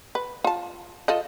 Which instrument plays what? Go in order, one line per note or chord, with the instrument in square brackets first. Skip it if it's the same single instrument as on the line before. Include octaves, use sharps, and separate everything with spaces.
[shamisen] B4
F4 A5
F4 A4 D#5